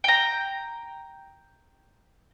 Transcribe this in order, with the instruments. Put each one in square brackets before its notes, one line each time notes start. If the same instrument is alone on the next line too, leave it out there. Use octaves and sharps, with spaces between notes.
[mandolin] G5 A#5